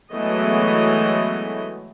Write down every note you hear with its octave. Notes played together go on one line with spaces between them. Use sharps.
E3 F#3 G#3 A3 B3 D#5